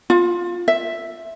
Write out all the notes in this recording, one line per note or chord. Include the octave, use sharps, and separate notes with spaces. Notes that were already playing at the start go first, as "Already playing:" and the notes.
F4
E5